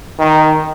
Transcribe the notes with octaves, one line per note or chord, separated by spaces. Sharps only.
D#3